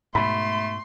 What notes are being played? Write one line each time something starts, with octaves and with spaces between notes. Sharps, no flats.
G#2 B2 A3 B5 C6